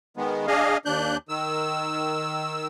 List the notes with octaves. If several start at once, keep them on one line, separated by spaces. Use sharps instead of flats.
D#3 G#3 B3
D4 G#4 D#5 F5
D#2 D4 F#6 G6
D#3 E6